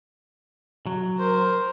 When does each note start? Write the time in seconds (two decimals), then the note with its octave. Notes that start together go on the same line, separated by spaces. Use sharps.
0.87 F#3
1.19 A#4 C5